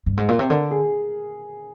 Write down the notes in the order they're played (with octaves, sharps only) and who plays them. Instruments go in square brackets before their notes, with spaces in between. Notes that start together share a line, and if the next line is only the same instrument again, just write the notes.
[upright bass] G2
G#2
A#2
C3
[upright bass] D3 [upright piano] A#4
[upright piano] G#4